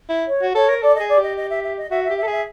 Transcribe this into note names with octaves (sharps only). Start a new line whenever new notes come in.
E4
C#5
F#4
A4 C#5
A#4
A4 D5
G#4 D#5
D5
G4
D#5
D#5
E5
E5
D#5
F#4 E5
G4 E5
A4 E5
G#4
E5